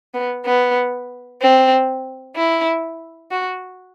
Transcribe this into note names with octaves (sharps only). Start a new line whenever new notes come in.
B3
B3
C4
E4
F#4